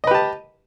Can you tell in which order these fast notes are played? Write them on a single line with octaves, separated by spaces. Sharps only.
D#5 B4 G4 A5